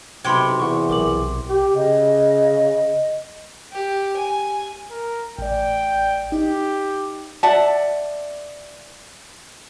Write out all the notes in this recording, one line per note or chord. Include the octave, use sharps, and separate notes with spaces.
B1 C3 G4 G5 B5 C6 G#6
E2 F#5 C#6
B1 A#4 D6 F#7
G4
C#3 D#5
G4
G#5
A#4
A1 D5 G5
D#4 G4
D5 E5 F#5 A5